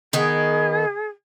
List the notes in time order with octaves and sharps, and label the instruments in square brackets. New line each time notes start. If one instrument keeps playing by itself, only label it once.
[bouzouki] D#3 B3 [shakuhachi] G#4